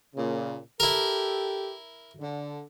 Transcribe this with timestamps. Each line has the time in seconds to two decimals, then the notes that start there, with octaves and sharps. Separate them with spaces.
0.15 A#2 C#3
0.80 E4 G4 A4 A#4
2.20 D3